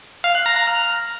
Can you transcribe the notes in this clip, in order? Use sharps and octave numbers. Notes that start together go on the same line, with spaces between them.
F5
F#6
A#5
A#5
F6